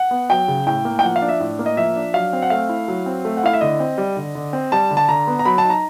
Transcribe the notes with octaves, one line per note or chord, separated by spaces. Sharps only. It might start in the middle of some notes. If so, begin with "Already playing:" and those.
Already playing: F#5
B3
F#3 G5
C#3
A2 G5
A#3
G5
F3 F#5
F5
D4
E5
A2
A#3
D#5
F3 E5
D4
F#3 F5
C4
F#5
A3 F5
E4
F#3
C4
A3
F#5
E4 F5
E5
D3 D#5
C4
G3
D3
D3
C4
G3 A5
D3
A5
D3 A#5
B3
A#5
F#3 B5
A5
D#4
A#5